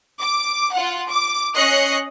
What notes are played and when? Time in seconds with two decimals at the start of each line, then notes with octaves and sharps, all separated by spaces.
0.21 D6
0.74 F4 F#5
1.09 D6
1.56 C#4 C#5 D#5 F#6 C7 C#7